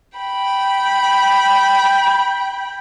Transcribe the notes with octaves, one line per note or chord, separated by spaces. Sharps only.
G5 B5